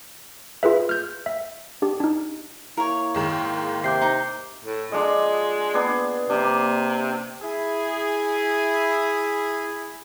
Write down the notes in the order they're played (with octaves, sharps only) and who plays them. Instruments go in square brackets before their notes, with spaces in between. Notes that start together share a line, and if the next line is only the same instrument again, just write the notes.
[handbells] F4 G#4 B4 E5
F6 G6
E5
D4 G4
D4 D#4
[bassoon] A#3 [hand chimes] E4 [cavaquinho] A#4 C#5
[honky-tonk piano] G#2 D#3 G#3
[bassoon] C3 [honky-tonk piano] A#3 [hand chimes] D6 G6 C7
[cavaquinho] D#4
[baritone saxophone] A2
[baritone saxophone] G#3 [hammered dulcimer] D4 F4 D#5
[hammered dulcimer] B3 D4 G#4
[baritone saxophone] C3 [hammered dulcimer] A#3 D4
[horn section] E4 G#4